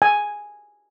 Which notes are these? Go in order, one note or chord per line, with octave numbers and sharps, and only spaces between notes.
G#5